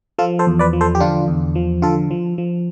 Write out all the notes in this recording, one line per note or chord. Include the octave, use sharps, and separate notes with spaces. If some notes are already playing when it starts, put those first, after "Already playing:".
F3 F4 A4
A4 C5
E2
B4 D5
F3
A4 C5
G4
D3 D4 F4
E2
F3
D3 F4 A4
F3
F3